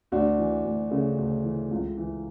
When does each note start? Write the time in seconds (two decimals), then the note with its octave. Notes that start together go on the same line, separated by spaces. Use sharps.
0.12 D2 D4 F#4
0.39 E3
0.64 D2
0.91 C#3 A3
1.18 D2
1.44 E3
1.71 C#2
1.97 E3